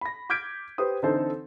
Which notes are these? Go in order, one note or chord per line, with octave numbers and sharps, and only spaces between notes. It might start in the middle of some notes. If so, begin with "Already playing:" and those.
B5 A#6
D6 F6 G6 G#6 B6 D7
G4 B4 C5 D#6
D3 E3 C4 D#4 A4 C5